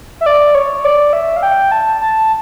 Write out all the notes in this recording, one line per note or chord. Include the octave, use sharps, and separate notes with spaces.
E5
D5
C#5
D5
E5
F5
G5
A5
A5